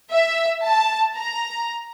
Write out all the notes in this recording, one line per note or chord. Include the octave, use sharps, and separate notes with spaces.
E5
A5
A#5